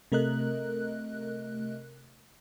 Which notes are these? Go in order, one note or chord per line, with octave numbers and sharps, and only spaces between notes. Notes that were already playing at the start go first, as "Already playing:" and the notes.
C3 A3 A#4 D#5 F#6